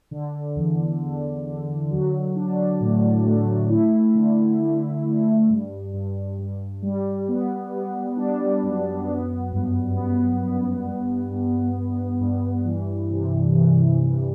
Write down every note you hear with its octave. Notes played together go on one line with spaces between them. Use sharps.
D3
E2
D3
D3
F#3
D4
A2
A3
E4
D3
D3
D3
G2
G2
G2
G3
B3
B3
D4
F#2
B3
G2
B3
B3
G2
G2
G2
G2
E3
C3
E3
E3